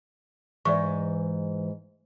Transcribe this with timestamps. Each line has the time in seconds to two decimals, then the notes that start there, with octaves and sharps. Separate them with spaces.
0.65 G#2 E3 D5 E5 C#6